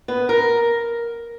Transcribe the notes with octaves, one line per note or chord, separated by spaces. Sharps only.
B3
A#4